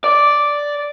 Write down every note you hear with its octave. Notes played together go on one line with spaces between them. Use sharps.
D5